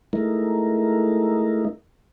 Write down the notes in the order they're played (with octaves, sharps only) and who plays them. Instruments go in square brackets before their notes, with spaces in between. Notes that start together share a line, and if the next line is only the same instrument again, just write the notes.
[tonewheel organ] G#3 A3 D#4 E4 A#4